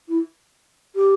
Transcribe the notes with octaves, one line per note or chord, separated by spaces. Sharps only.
E4
G4